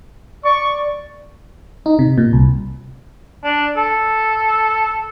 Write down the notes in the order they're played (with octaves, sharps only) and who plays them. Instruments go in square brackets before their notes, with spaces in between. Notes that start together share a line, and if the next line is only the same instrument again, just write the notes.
[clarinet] D5 [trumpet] C#6
[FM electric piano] D#4
C3
A#2
C2
[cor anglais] D4
A4